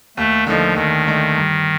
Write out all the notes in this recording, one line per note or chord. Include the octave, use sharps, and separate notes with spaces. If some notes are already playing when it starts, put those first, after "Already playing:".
D#2 A3
D3 F3 A3 D#4
D#2 D#3
D3 A3 D#4
G2